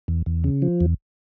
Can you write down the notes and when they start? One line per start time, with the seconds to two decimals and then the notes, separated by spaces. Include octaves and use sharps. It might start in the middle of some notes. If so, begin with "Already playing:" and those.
0.08 E2
0.26 E2
0.44 C#3
0.62 F3
0.80 E2